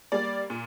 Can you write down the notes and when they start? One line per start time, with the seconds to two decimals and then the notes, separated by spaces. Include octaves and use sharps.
0.12 G3 A#3 D5
0.50 A#2